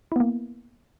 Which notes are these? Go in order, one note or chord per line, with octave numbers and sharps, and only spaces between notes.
A#3 B3 E4